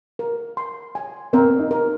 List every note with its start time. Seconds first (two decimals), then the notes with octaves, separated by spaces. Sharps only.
0.19 A#4
0.57 C6
0.95 G#5
1.33 C4 A#4
1.59 D#4
1.71 A#4